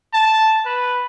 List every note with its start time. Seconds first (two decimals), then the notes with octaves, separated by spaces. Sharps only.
0.13 A5
0.65 B4